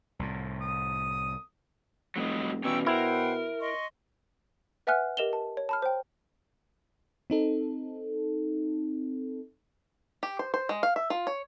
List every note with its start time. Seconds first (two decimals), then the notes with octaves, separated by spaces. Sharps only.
0.19 C2 A2
0.61 D#6
2.16 F1 F#3 G3 D#5
2.64 B2 E3 G3 C#4 G5 C#6 E6
2.87 E4 A#4 C5 F#5 G5
3.60 D#5 C6 C#6
4.87 B4 E5 F#5 G#5 F6 F#6
5.17 G4 A#4 D#5 E7 F7 G7
5.33 A5
5.57 C#5
5.69 A5 B5 F6
5.82 C5 G5
7.30 C4 D#4 A4
10.23 G4
10.39 C5
10.54 C5
10.69 G#3
10.83 F5
10.96 E5
11.10 F4
11.27 C#5